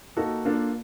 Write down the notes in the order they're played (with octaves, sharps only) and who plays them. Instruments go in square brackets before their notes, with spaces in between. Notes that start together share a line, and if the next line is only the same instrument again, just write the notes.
[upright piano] A#3 D#4 F#4 A4
A#3 D4 F4 A4